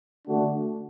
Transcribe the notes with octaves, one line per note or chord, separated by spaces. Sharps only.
D3 A3 D4 F#4